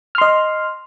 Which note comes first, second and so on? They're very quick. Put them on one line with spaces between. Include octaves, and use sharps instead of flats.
F6 C6 D#5